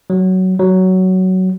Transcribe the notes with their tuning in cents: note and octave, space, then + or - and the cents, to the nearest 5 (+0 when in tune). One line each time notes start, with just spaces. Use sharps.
F#3 +10
F#3 +10